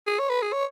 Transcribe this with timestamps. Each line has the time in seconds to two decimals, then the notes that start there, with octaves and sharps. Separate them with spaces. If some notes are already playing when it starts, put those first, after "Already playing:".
0.07 G#4
0.19 C#5
0.29 B4
0.42 G#4
0.53 C#5